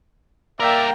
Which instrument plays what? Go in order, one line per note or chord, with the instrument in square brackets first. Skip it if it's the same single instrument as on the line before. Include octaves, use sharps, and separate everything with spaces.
[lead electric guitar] G3 A#4 [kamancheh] A#3 G5 [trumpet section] D5 E5